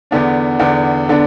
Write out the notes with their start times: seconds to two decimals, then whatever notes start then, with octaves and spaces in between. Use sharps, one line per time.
0.11 E2 D3 B3 D4
0.59 E2 D3 B3 D4
1.09 D3 B3 D4